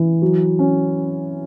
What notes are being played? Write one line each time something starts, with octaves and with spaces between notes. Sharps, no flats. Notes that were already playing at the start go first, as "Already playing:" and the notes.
Already playing: E3
F#3
C#4